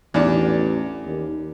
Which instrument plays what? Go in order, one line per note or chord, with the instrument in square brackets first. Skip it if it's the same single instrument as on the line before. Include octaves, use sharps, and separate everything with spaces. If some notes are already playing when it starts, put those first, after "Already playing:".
[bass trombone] A1 [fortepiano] E2 D4
[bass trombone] D#2